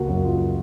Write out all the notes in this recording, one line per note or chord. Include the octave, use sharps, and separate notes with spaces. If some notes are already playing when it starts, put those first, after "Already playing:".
Already playing: C#2 A#3 F#4 A#4
F#2
F4